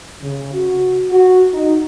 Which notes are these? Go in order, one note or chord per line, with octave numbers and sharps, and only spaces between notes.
C#3
F#4
F#4
D#4